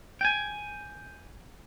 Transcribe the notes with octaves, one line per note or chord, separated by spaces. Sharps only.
G5 G#5